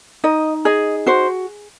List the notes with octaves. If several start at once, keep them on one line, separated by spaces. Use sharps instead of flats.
D#4 D#5
G#4 D#5
F#4 C5